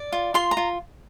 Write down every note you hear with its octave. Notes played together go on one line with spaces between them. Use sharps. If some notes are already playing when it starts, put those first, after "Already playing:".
Already playing: D5
F4
F4 C6
A#5
F4